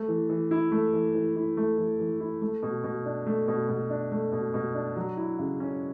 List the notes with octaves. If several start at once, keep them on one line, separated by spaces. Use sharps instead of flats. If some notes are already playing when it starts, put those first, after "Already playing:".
Already playing: A3
E3
E3
E4
A3
E3
E3
E4
A3
E3
E3
E4
A3
B2
B2
D4
A3
B2
B2
D4
A3
B2
B2
D4
F#3
E4
C#3
C#4